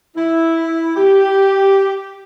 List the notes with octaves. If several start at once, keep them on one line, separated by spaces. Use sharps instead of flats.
E4
G4